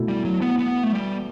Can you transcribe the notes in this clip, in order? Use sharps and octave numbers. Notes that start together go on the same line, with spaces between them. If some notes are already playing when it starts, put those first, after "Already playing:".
Already playing: B2 A3 E4
G3
F#3
B3
B3
A3
G3